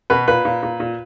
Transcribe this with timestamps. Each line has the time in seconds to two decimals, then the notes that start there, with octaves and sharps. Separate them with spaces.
0.10 B2 B4
0.28 A#2 B4
0.45 A#2
0.63 A#2
0.80 A#2